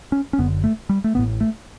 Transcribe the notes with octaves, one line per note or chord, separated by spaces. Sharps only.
C#4
C#4
F#1 F#2 D3 B3
A3
G3
A3
A1 A2 B3
A3